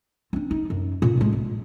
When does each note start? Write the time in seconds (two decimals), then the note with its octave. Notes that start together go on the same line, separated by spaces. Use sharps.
0.33 C4 D4
0.51 D#4
0.70 F#2
1.02 A#2
1.17 A2 G#3
1.32 A#1